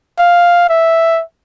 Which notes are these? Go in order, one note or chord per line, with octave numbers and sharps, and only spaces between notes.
F5
E5